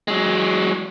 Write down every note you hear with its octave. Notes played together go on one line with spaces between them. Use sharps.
F#3 G#3